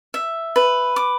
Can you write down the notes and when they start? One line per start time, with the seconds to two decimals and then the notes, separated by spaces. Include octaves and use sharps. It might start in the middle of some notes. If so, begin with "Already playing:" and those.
0.14 E5
0.56 B4
0.96 D6